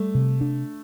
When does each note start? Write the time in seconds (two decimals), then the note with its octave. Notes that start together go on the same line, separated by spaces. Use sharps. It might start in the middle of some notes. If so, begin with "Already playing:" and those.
Already playing: G3 A3
0.15 C3
0.41 D4